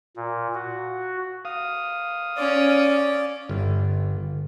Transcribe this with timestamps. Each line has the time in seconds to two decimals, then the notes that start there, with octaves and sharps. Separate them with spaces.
0.16 A#2
0.55 F#4
1.45 F5 D#6
2.37 C#4 D5
3.49 G1